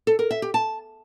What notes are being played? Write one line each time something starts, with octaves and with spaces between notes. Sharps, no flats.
A4
A#4
E5
G4
A5